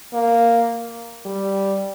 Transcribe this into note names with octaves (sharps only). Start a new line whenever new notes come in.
A#3
G3